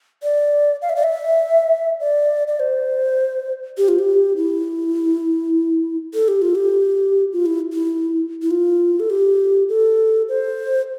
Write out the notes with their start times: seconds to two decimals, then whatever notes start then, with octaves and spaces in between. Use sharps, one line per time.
0.23 D5
0.82 F5
0.89 E5
0.96 D5
1.03 E5
2.00 D5
2.48 D5
2.60 C5
3.78 G4
3.88 F4
3.99 G4
4.37 E4
6.14 A4
6.28 G4
6.42 F4
6.55 G4
7.33 F4
7.46 E4
7.73 E4
8.42 E4
8.51 F4
9.00 A4
9.10 G4
9.69 A4
10.29 C5